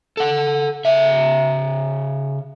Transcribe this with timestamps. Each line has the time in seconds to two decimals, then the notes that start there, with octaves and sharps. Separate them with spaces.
0.17 A4 F#5
0.85 C#3 E5